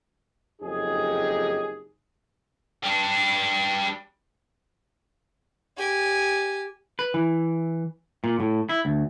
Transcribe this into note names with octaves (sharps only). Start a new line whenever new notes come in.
F#1 F2 D#4 G4 G#4
G3 D4
G4 G#5
B4
E3
A#2
A2
E4
D2